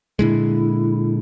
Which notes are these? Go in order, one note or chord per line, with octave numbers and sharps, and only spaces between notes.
A#2 D3 G#3 E4